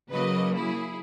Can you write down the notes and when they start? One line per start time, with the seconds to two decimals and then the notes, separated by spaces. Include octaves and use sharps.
0.11 C#3 F#3 A#3 B4 D#5
0.54 E4 G#4